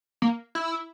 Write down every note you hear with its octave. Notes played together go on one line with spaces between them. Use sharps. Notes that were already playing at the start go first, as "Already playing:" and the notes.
A#3
E4